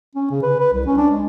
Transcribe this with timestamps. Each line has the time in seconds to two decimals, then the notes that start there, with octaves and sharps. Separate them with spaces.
0.15 C#4
0.31 C#3
0.43 B4
0.60 B4
0.73 C2
0.86 C#4
0.98 D4
1.11 G#3